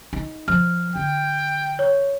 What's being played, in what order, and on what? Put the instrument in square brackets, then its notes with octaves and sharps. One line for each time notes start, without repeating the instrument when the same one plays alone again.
[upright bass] D#4
[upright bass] F3 [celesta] F6
[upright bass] D3 [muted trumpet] G5
[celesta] C#5